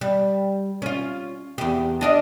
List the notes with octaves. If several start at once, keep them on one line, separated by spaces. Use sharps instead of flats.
G3
C#4 F4
E2 G4
D4 D#5 F5